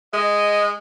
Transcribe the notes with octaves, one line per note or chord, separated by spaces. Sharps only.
G#3 D#5